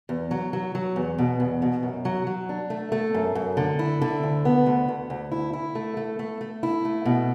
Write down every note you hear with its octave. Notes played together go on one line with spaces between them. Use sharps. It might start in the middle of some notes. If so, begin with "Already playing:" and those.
E2
F#3
F#3
F#3
E2
B2
E2
B2
F#2
F#3
F#3
D4
A3
A3
F#2
F#2
D3
E4
D3
D2
B3
D2
D2
D2
E4
E4
A3
A3
A3
A3
E4
A3
B2